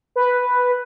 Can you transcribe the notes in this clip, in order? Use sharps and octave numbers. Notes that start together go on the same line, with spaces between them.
B4